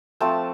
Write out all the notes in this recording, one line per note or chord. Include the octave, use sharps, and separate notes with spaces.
F3 A3 C4 A5